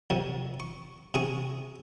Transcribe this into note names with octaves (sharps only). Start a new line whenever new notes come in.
F2 C3
C#6
C3 G#4 C#6